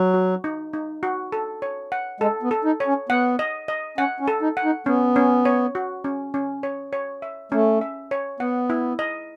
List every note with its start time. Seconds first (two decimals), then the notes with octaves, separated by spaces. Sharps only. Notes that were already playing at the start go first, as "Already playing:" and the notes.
Already playing: F#3
0.14 F#4
0.44 D#4
0.73 D#4
1.03 F#4
1.32 A4
1.62 C#5
1.92 F#5
2.20 G#3 A4
2.43 B3
2.51 A4
2.65 D#4
2.80 C#5
2.87 C#4
3.09 B3 F#5
3.39 D#5
3.68 D#5
3.98 C#4 F#5
4.20 C#4
4.28 A4
4.42 D#4
4.57 F#5
4.64 D#4
4.86 B3 C#4
5.16 C#4
5.45 C#5
5.75 F#4
6.04 C#4
6.34 C#4
6.63 C#5
6.93 C#5
7.22 E5
7.52 A3 C#4
7.81 E5
8.11 C#5
8.40 B3 F#5
8.70 E4
8.99 D#5